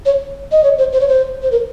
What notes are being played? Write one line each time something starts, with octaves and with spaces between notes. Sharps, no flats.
C#5
D#5
C#5
C5
C5
C#5
C5
C5
A#4